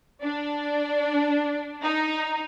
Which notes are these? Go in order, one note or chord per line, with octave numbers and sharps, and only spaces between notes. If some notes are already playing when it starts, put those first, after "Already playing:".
D4
D#4